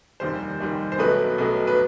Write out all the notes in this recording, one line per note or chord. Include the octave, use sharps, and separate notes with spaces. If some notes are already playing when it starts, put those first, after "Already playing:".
F1 D#2 D#3 G3 C5
F1 D#2 D#3 G3
C5
B1 B2 F#3 A3 B4
B1 B2 F#3 A3
B4